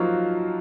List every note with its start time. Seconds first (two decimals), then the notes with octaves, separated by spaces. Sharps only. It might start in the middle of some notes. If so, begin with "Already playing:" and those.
Already playing: F3 F#3 A#3 D#4 F4 F#4